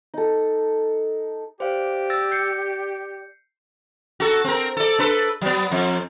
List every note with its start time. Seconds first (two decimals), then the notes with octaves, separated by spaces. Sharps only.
0.14 D#4 A4
1.60 G4 C5 D5 F5
2.10 E6 A6 A#6
2.31 G6 C7 C#7
4.20 F#4 A4
4.45 C4 A#4
4.77 A4 D5
4.99 D4 A4 B4
5.41 F#3 B3
5.71 F2